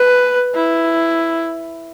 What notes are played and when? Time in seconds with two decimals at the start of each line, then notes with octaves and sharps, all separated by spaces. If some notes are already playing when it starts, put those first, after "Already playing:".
Already playing: B4
0.55 E4